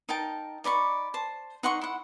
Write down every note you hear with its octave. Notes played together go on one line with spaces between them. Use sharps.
D#4 A#4 G5 A5
D#4 D5 B5 C#6
C5 A5
D#4 F#5 C6 C#6
E4 F#5